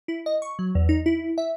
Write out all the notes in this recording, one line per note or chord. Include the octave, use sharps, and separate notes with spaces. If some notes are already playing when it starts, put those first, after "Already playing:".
E4
D#5
C#6
F#3
E2
D#4
E4
E5